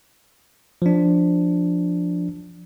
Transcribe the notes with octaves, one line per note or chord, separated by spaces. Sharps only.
F3 D4